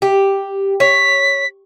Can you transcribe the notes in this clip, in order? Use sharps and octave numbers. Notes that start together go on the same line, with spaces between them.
G4
C#5 B6